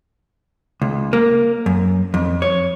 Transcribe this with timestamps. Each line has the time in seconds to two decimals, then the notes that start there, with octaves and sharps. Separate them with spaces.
0.82 C#2
1.13 A#3
1.66 F#2
2.14 F2
2.42 C#5